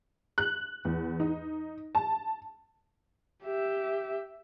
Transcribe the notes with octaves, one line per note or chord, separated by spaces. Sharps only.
F#6
E2
D#4
A5
G4 E5